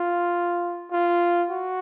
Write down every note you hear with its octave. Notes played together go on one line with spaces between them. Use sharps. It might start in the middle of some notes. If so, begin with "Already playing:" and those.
Already playing: F4
F4
F#4